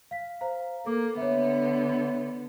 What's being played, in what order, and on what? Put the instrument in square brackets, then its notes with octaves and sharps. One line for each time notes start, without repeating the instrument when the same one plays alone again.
[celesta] F5 B6
C5 F5 A#5
[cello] A#3 [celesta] A4 D6
[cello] D3 B3 [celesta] C#5 E5